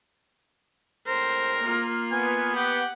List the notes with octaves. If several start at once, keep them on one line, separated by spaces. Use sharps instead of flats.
A2 G#3 C4 A#4 C5
A#3 F4
B3 G#5
G4 F#5